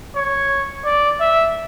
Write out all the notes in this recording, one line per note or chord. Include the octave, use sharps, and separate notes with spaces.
C#5
D5
E5